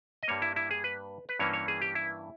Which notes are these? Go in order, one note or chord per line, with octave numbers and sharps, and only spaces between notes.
D#5
G2 G3 A#3 C#5
E4
E4
G#4
B4
B4
G2 E3 A#3 C#4 C#5
C#5
G#4
G4
E4